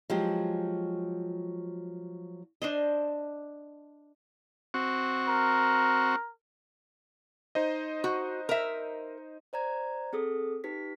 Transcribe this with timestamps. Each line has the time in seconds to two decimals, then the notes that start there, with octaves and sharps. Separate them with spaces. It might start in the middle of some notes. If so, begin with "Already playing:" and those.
0.10 F3 F#3 G#3 G4
2.62 D4 C5 D#5
4.74 C4 F#4 C#6
5.28 A#4
7.55 D#4 C5 D#5
8.04 F#4
8.49 A#4 E5
9.53 C5 D5 A#5 G#6
10.13 C4 G#4 A4 D#6
10.64 D#4 G4 B4 B6